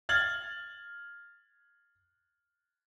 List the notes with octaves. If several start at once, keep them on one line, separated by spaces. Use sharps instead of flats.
F6 G#6 A6 F#7